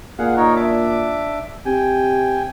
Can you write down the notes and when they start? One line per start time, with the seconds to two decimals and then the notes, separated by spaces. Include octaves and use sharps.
0.19 A#2 G#4 F5 F#5
0.37 D#4 A#4 C#5
0.56 D4 E5 D6
1.65 C3 G5 G#5